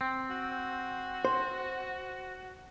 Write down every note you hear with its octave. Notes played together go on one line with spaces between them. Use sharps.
C4
F#4
C5